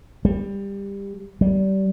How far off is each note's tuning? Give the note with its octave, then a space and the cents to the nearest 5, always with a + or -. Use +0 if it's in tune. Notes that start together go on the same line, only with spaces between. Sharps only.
G3 +20
G3 -25